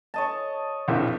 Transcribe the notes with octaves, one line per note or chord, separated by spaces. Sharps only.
C#5 D#5 A5
A#1 F2 E4